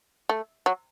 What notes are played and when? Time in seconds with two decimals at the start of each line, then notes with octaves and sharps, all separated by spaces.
0.29 A3
0.66 F#3